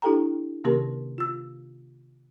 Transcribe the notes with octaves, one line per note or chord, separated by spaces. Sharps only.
D4 E4 G4 A4 G5 A#5
C3 D#3 A#3 C#4 G4 A#4
F4 E6